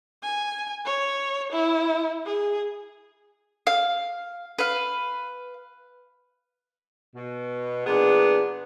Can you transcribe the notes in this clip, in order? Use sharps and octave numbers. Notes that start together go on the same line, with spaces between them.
G#5
C#5
E4
G#4
F5
B4 F5
B2
A#2 E3 B3 D4 G#4